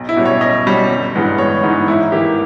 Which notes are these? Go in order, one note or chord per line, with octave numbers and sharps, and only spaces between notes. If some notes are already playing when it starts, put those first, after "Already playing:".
Already playing: B1
E4
B2 G3 C#4
C#5
B1 D#5
B2 G3 C#4
G1
G2 E3 G#3 B3
G1 C#5
G2 E3 G#3 B3 D#4
G#2 E4
E3 A#3 G4